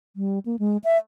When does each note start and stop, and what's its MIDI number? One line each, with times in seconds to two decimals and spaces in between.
0.16 0.39 55
0.46 0.56 58
0.59 0.77 56
0.84 0.97 76